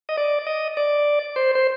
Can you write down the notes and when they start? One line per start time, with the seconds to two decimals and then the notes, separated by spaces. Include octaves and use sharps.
0.09 D#5
0.17 D5
0.47 D#5
0.77 D5
1.36 C5
1.55 C5